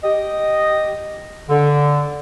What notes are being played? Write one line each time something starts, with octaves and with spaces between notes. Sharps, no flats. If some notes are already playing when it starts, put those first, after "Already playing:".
G4 D#5
D3